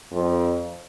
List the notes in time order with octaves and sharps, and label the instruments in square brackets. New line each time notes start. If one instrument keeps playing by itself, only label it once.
[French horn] F2